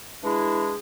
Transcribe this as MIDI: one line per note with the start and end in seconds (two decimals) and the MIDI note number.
0.23 0.74 52
0.23 0.74 56
0.23 0.74 62
0.23 0.74 64
0.23 0.74 68